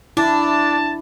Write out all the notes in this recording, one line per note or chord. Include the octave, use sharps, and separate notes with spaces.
D4 E4 A5